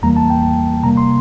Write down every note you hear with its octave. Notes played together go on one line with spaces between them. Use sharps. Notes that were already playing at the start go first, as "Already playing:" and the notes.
E2 E3 G3 A#3 A#5
A5
G5
C3 G3 A#3 A#5
C6